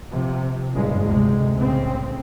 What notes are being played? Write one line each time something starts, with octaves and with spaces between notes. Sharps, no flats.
C3 F3
F#1 G2 A#2 C#3 G#3
D2 C3 G#3
C2 A2 C#3 C4